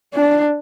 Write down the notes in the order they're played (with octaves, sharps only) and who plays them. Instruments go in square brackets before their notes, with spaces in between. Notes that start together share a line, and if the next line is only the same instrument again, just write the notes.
[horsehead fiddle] D4